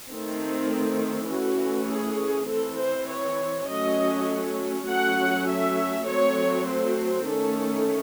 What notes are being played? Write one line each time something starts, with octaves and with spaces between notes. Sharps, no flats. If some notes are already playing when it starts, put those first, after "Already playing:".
D#3 A3 C4
E3 A3 C#4 F#4
G#4
E3 C4 A4
C5
C#5
F#3 A3 C#4 D#5
F#3 A3 C#4 F#5
E5
F#3 A3 C4 C#5
C5
D#3 A3 C#4 A4